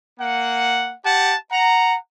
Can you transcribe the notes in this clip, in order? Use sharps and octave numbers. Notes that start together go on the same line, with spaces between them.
A#3 F#5
G4 F#5 A5
F#5 A#5